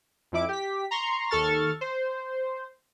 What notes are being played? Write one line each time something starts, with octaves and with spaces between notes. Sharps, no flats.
F2 F3 E4 D6
G4 B6
A#5 C6 C#6
D#2 A4 C#6 F6 A6
C5